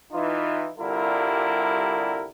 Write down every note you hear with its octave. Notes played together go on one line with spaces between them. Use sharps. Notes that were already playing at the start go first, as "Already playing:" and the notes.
E3 D#4 F4
C2 D3 G3 E4 F4 A#4